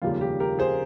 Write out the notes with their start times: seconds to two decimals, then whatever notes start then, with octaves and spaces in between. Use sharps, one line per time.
0.02 F1 D#2 C#3 G3 A#3 F4
0.21 G4
0.40 G4 A#4
0.59 G#4 C5